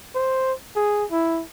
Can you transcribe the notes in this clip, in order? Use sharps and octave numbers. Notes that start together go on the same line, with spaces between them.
C5
G#4
E4